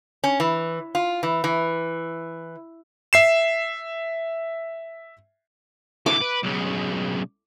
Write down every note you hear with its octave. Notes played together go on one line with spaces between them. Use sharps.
C#4
E3
F4
E3
E3
E5 C7 E7
D3 E3 D6
B4
B1 C#3